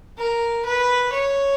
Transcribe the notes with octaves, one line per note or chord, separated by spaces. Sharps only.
A#4
B4
C#5